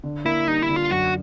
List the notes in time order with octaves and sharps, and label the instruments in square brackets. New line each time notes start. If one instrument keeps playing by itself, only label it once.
[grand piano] D3
[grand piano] A#3 [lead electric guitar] E4
[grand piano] G3 [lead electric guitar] D#4
[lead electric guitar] E4
[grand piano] D3
[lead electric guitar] F4
[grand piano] F#2 [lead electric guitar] F#4